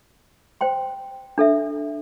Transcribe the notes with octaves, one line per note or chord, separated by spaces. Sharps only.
C5 G5 C6
D4 A4 E5